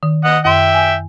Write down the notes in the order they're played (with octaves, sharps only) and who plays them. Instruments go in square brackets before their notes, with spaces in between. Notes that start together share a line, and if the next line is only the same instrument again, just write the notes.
[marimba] D#3
[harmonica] D#5 F#5
[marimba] F#2 C6 [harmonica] E5 G5
[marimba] G#5